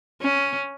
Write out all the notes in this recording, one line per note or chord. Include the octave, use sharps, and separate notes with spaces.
C#4